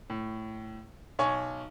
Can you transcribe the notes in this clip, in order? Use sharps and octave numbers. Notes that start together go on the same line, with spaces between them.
A2
B1 C#5 G#5 C#6